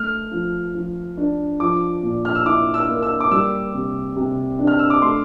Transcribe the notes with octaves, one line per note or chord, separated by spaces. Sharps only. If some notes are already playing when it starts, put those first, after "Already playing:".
Already playing: A3 F6
F3
F3
D4
F3 D6
A#2
F6
E6
E4 D6
E6
A#3
E6
D6
G3 E6
C3
C3
D4
F6
E6
D6
A3 C6